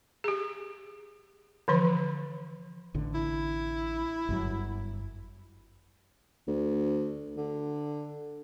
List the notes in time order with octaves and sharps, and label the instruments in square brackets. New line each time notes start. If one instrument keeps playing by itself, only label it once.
[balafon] G4 G#4
D3 E3 F3 B5
[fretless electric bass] A1 A2 D3
[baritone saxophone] E4
[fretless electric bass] G1 F#2 F#3
[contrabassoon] D2
D3